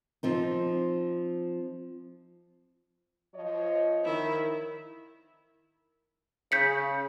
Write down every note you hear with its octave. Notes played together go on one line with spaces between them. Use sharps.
F3 C4 D#4
F3 C#5 D#5
D#3 E4
C#3 G6 B6 C#7